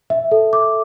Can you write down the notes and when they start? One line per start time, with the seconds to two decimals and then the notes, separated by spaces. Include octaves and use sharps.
0.10 E5
0.31 A4
0.53 D6